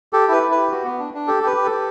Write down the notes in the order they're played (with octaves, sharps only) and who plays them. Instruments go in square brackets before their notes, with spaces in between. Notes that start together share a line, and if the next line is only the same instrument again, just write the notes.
[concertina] G4 A4
E4 B4
E4
B4
G4
F#4
B3
D4
D4
G4 A4
G4 B4
G4
A4
G4